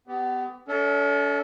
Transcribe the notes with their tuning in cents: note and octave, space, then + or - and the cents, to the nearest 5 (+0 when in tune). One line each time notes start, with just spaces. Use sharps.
B3 +30 G4 +0
C#4 +45 A4 +0 E5 -30